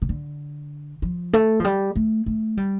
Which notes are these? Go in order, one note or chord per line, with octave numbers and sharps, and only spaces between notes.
C3
D3
F3
A3
F3
G3
A3
A3
G3